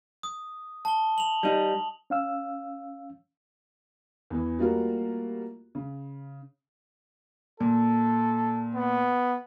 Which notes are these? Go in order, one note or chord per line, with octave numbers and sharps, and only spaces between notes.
D#6
A5 G7
F7 F#7
G3 D#4
C#4 F5 E6
E2 E3
G3 A3 A#3 F4 F#4 A#4
C#3
A#2 A4
B3